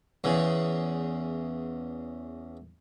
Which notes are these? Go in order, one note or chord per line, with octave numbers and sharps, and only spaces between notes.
E2 C#3